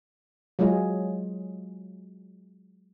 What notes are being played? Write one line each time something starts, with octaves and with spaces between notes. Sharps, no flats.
F#3 G#3 F4 G#4 D#5